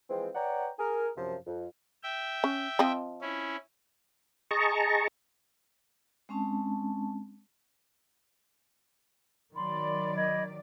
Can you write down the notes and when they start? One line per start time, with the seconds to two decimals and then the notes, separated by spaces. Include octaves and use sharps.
0.10 E3 F3 G#3 C4
0.34 B4 C#5 D5 F#5 G5 A#5
0.79 G#4 A#4
1.17 F#2 C3 F3
1.47 F2
2.03 E5 G5
2.44 C#4
2.79 F3 C4 D#5
3.21 C#4 E4
4.51 G#4 D#5 A5 A#5 C#6
6.29 G#3 C4 C#4 A5
9.55 D#3 F#3 D5 B5 C6
10.15 D#5 B5 G#6